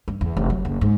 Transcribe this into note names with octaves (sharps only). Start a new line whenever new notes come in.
G2
E2
F1
F#3
F#1
G#2